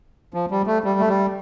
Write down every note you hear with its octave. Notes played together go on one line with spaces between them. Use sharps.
F3
G3
A3
G3
A3
G3